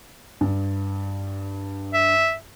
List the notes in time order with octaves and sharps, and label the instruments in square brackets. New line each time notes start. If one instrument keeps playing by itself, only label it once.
[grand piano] G2
[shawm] E5